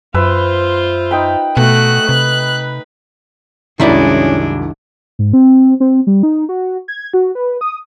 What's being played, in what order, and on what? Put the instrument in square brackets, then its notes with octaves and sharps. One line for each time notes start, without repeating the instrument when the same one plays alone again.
[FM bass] F#2 [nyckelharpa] F4 C5 [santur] B4 E5 B5
[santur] D#4 G5 B5
[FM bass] B2 [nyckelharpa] A3 F#4 [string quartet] F#6
[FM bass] C3 [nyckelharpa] B4
[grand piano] C2 F#2 [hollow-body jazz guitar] D#3 E4 D5 [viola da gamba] G#3 D4 [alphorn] C#4
[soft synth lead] G#2
C4
C4
G3
D#4
F#4
G#6
F#4
B4
D#6